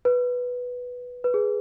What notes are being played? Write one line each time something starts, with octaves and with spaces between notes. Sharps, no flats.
B4
B4
G#4